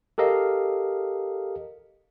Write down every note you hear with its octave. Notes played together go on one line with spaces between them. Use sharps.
G4 A4 A#4 D#5 F5